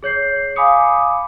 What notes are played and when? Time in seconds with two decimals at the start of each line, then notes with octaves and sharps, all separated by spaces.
0.03 G#4 C#5 G6 C7
0.56 F5 G#5 B5 D6 D#6 C#7